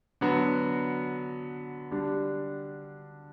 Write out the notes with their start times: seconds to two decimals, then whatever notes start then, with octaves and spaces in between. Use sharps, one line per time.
0.21 D3 F#3 B3 F#4
1.91 D3 G3 D4